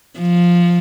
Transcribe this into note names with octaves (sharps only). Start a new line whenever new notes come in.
F3